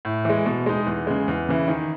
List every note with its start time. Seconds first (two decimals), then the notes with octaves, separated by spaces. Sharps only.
0.05 A2
0.25 E3 G#3
0.46 B2
0.66 G#3 D#4
0.86 E2
1.07 C#3 G#3
1.28 E2
1.49 C#3 E3
1.68 D#3